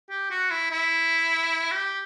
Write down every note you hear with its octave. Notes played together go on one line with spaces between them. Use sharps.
G4
F#4
E4
E4
G4